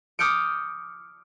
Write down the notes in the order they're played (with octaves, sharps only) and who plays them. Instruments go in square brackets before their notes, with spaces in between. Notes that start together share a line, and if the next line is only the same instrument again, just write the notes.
[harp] D6 D#6 F6 G6 C#7 D7